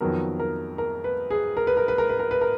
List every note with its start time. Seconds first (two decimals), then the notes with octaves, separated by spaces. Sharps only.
0.01 F2 D#3 F#3 B3 A#4
0.40 A#4
0.78 A#4
1.04 B4
1.30 G#4
1.57 A#4
1.67 B4
1.77 A#4
1.88 B4
1.98 A#4
2.09 B4
2.19 A#4
2.31 B4
2.41 A#4